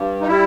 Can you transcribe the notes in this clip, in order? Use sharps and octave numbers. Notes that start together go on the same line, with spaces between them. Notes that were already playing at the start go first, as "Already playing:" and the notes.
Already playing: G2
D#4
G3 E4